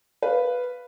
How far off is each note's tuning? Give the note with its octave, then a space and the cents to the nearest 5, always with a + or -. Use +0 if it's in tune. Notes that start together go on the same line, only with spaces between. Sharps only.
B4 +0 D5 -45 F5 +0